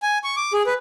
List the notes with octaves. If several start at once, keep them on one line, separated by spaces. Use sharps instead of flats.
G#5
C#6
D6
G#4
B4